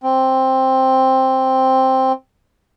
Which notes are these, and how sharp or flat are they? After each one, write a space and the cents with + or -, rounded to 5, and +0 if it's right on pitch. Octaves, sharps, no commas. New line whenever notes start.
C4 +5